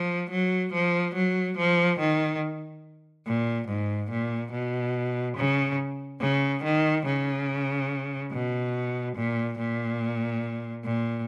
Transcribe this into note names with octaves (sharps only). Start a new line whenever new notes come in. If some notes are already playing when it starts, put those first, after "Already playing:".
Already playing: F3
F#3
F3
F#3
F3
D#3
A#2
G#2
A#2
B2
C#3
C#3
D#3
C#3
B2
A#2
A#2
A#2